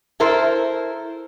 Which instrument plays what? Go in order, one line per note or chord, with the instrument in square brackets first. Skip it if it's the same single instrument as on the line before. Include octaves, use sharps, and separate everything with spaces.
[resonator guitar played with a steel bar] E4 A4 A#4 C5